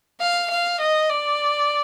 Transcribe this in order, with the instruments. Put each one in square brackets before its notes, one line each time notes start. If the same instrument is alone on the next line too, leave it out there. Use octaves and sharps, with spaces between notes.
[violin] F5
F5
D#5
D5